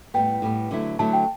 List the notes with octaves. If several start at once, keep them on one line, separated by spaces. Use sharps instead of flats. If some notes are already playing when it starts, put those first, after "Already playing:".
A2 G3 B3 G5
A2 G3 B3
D3 F#3 A3 E4
D3 F#3 A3 E4 A5
G5